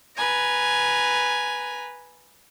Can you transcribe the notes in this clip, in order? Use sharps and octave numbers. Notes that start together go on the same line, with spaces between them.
B4 G#5 A#5